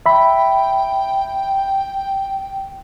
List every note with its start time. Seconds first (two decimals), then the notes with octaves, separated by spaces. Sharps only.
0.06 E5 G5 B5